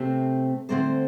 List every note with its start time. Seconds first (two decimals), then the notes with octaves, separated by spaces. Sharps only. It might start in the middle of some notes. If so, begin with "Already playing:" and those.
Already playing: C3 A3 C4 A4
0.69 D3 A3 C4 A4 C5